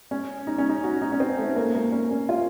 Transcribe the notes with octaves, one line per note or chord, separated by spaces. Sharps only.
C#4
D#4
C#4
D#4
F#4
D#4
C#4
C4
A3
A#3
A#3
C#4
C#4
F4